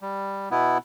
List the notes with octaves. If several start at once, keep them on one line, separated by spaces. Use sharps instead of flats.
G3
B2 B3 E4